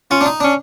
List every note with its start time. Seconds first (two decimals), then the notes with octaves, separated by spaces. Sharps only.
0.11 C#4 F4
0.21 D4
0.26 D#4
0.40 C#4 D4